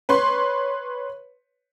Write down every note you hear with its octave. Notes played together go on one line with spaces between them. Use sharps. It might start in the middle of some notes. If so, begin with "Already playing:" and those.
B4 C#5 C6